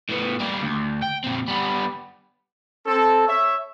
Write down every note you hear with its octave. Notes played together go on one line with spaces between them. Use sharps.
A2 B3
G3 A#3
D2
G5
A#2 C4
G3 B3
C4 A4
C#5 E5